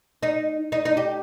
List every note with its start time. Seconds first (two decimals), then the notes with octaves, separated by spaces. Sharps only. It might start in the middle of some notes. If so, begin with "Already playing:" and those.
0.23 D#4
0.72 D#4
0.85 D#4
0.97 G4